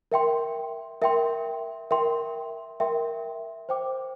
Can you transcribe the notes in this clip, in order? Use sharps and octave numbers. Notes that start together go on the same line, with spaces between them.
A#4 E5 G5 C6
A#4 E5 G5 C6
A#4 E5 G5 C6
A#4 E5 G5 C6
C5 G5 D6